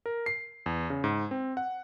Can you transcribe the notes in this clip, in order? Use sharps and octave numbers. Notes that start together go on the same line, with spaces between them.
A#4
C7
E2
C#3
G#2
C4
F#5